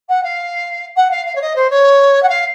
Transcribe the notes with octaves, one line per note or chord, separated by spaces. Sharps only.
F#5
F5
F#5
F5
F5
C#5
D#5
C5
C#5
F#5
F5